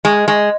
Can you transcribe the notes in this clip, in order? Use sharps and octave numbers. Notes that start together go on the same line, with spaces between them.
G#3 D#5
G#3